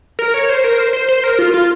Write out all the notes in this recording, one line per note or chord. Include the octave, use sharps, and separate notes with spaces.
A#4
C#5
C5
A#4
C5
C5
C5
A#4
F4
F4